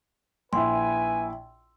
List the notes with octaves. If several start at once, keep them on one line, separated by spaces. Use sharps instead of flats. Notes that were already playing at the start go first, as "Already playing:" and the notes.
A#1 E4 B4 G#5 C6